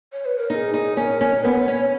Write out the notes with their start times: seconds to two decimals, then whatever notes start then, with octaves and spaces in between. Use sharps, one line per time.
0.13 C#5
0.25 B4
0.38 A#4
0.50 D#4 G#4 A#4
0.74 D#4
0.97 C#4 A#4
1.21 C#4
1.44 B3 C#5
1.68 C#4